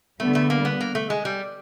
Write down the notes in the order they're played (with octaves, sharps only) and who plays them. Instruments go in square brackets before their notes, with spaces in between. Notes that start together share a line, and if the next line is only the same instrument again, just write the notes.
[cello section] D3 G3 B3 [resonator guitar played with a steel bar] A3
[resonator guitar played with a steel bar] A3
A#3
B3
A#3
A3
G#3
G3